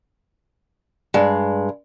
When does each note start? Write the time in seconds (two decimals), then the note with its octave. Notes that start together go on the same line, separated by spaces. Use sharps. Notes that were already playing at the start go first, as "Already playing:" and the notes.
1.14 G2 G#3